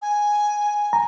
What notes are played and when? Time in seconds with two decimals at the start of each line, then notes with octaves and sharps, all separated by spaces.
0.02 G#5
0.93 A#5